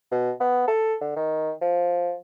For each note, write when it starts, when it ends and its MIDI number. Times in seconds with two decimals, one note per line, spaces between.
0.12 0.31 47
0.40 0.64 59
0.68 0.94 69
1.01 1.15 50
1.16 1.52 51
1.61 2.15 53